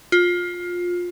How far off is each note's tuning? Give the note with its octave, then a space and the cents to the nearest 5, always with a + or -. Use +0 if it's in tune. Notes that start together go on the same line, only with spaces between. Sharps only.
F4 +20